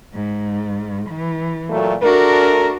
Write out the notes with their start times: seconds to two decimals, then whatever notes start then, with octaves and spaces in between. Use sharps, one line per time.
0.14 G#2
1.09 E3
1.69 A#2 F#3 A3
2.02 A3 D4 F#4 A#4